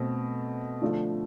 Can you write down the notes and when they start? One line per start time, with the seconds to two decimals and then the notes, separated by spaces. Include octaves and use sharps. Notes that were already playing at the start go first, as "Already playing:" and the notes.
Already playing: B2 A3 C4
0.82 D3 F3 A3 D4 F4